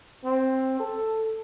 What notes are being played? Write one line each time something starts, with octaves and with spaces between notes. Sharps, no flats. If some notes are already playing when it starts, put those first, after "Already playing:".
C4
A4